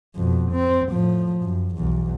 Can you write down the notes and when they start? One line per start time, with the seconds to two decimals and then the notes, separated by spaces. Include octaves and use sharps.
0.15 F2 B2
0.52 C4
0.91 A2 F3
1.43 F#2
1.75 B1 E2